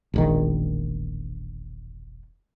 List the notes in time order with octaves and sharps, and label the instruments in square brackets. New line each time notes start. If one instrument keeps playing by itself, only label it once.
[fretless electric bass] E1 A#1 D#3